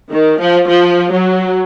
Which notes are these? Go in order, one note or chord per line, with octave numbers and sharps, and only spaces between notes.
D#3
F3
F3
F#3